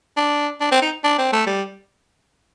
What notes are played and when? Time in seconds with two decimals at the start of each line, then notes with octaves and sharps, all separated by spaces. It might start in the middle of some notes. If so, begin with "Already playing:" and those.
0.17 D4
0.61 D4
0.72 C4
0.82 D#4
1.04 D4
1.18 C4
1.33 A3
1.47 G3